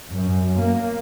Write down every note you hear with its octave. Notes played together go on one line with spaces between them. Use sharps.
F#2
A#3